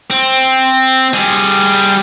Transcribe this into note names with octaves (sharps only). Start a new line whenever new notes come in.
C4
G3 G#4